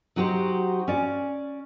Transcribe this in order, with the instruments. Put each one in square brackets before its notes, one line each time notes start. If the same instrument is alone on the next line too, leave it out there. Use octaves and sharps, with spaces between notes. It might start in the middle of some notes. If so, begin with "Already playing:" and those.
[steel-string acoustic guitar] F#3 D#4 F#4 G4 C5
C#4 D5